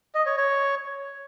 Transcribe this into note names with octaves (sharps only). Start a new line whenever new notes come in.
D#5
C#5
C#5